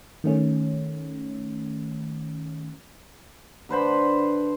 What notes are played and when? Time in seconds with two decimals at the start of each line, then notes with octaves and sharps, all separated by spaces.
0.24 D#3 A3 C#4
3.69 D3 B4 C5 B5